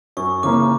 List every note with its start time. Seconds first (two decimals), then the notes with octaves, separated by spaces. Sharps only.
0.17 F#2 C#6
0.43 C#3 E3 A#3 C#4 D6